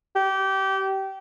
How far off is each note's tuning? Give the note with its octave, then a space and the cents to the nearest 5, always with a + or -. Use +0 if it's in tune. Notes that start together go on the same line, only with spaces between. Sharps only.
G4 -25